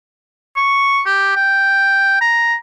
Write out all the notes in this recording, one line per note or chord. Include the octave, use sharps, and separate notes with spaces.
C#6
G4
G5
A#5